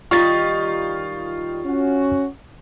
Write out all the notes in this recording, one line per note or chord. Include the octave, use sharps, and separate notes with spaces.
D#3 G3 D#4 F4 C#6 A6
C#4 F#4